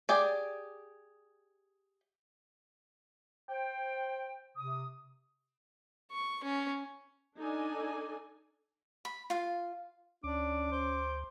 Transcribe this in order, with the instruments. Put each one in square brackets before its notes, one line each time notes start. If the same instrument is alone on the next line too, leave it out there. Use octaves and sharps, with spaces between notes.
[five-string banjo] G4 G#4 D5
[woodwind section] C5 G5
C3 D#6
[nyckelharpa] C#6
C#4
[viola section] D4 D#4 A4 D5 D#5 G#5
[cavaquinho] B5
F4 F5
[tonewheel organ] D2 [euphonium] C#4 [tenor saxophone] D4 [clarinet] D6
[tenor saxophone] C5